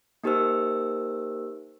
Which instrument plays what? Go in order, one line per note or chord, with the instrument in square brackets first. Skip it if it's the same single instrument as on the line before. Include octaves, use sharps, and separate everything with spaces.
[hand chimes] A#3 D#4 G4 A#4 C5 E6